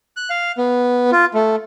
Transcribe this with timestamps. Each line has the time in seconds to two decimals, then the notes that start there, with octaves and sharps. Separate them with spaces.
0.17 F#6
0.30 F5
0.58 B3
1.12 F4
1.34 A3